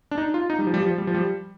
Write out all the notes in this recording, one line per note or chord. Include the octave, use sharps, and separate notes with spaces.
D4
D#4
F4
D#4
G3
F3
G3
F3
G3
F3
G3